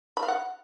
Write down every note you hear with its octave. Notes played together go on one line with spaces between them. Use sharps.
B5
F5
F#5